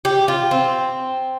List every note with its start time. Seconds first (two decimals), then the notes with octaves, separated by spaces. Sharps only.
0.05 G4
0.28 F4
0.51 C4